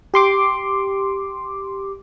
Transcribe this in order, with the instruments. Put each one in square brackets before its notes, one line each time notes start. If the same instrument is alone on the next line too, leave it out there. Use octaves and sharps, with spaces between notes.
[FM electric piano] G4 C6 D6